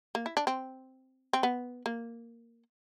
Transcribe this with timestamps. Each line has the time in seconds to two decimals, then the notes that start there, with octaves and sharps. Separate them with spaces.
0.15 A#3
0.26 E4
0.37 D4
0.47 C4
1.33 C4
1.43 B3
1.86 A#3